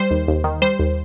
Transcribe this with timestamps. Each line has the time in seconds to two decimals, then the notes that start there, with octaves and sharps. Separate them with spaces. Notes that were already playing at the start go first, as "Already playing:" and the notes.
Already playing: G3 C5
0.11 D#2
0.28 D#2
0.44 D#3
0.62 G3 C5
0.79 D#2